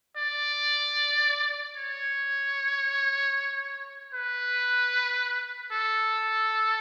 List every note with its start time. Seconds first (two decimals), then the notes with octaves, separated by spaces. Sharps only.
0.17 D5
1.76 C#5
4.13 B4
5.71 A4